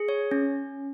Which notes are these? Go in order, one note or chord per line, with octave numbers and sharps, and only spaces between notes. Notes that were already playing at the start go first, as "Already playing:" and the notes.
Already playing: G#4
C#5
C#4